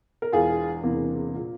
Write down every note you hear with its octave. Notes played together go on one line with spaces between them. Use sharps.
A#4
E1 E2 E3 F4 G#4
E1 E2 C3 E3 A#3
A#2